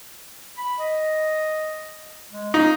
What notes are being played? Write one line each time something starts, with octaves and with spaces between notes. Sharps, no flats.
B5
D#5
G#3
D#4 F5